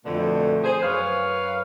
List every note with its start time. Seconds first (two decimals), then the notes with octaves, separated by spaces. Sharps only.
0.05 F2 B2 D3 A3
0.64 G#4 C5
0.82 F#2 B4 C#5 F5